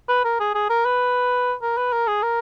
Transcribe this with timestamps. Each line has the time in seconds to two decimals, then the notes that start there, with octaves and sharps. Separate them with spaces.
0.08 B4
0.24 A#4
0.40 G#4
0.55 G#4
0.70 A#4
0.85 B4
1.62 A#4
1.77 B4
1.92 A#4
2.07 G#4
2.22 A#4